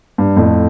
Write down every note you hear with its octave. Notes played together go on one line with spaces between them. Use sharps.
G2
F2 A2